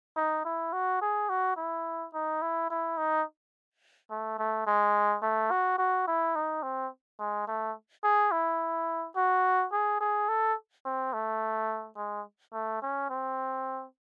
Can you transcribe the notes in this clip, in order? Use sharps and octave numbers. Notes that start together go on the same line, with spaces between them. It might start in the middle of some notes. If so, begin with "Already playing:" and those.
D#4
E4
F#4
G#4
F#4
E4
D#4
E4
E4
D#4
A3
A3
G#3
A3
F#4
F#4
E4
D#4
C4
G#3
A3
G#4
E4
F#4
G#4
G#4
A4
C4
A3
G#3
A3
C#4
C4